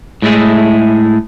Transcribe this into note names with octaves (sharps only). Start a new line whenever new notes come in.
A2 G#3 A3 E4 G#4